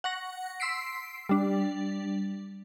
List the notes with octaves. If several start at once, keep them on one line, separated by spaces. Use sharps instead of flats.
F#5 C#6 A#6
C6 E6 B6 C7 D7
G3 D4